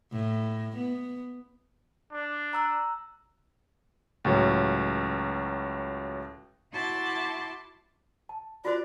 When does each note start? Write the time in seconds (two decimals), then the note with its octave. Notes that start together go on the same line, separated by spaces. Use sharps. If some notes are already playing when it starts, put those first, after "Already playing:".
0.13 A2
0.77 B3
2.12 D4
2.53 A#5 E6 F#6
4.25 C#2 A2 F#3
6.72 E4 F#4 A5 C6 D6
8.29 A5
8.65 F4 F#4 C5 D5